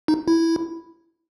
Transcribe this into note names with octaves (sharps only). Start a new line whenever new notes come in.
D#4
E4